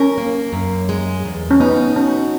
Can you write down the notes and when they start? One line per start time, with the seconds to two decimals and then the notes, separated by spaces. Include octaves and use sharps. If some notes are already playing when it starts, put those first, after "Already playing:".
Already playing: C#4 A#4
0.18 A#3
0.53 F#2
0.89 G#3
1.25 E2
1.51 C#4
1.60 B3 D#4
1.96 C#4 F#4